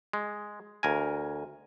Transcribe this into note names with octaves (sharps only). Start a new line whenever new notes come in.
G#3
D2 A#4 G#5